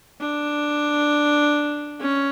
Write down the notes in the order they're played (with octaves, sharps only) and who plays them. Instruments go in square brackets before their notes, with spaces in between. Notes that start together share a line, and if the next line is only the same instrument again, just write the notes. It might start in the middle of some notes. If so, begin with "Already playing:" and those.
[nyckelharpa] D4
C#4